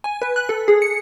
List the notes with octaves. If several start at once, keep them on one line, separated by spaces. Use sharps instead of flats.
G#5
B4
F#6
A4
G#4
C#7